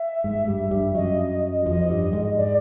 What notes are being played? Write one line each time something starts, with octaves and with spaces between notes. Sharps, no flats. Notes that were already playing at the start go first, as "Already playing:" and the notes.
Already playing: E5
G#2 G#3
G2 G3
G2 G3
F#2 F#3 D#5
F2 F3 D#5
G2 G3
G#2 G#3
D5